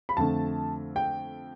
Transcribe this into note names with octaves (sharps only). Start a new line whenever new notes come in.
B5
F2 D3 A3 A5
G5